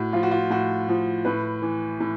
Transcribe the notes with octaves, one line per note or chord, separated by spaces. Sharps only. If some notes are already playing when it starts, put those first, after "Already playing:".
Already playing: A2 F#4
F3 F4
F#4
F4
A2 F#4
F3
A2 B4
E3
A2